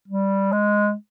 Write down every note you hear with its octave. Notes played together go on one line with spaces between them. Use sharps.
G3
G#3